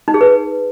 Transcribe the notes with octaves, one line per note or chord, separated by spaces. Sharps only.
D#4
G#4
B4